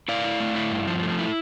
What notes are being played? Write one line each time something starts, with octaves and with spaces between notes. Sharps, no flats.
E4 D5 F5
E4
A3
E4
G2
F3
A3
E4